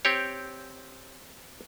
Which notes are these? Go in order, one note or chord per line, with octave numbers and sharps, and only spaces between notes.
C4 G4 C#5